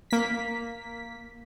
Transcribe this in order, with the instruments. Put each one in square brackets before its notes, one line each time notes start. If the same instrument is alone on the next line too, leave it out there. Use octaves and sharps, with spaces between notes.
[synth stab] A#3 B6